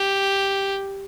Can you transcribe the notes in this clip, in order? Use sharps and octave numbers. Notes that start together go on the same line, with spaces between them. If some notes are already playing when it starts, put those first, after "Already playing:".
Already playing: G4